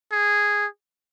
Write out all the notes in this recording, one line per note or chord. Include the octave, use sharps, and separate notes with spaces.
G#4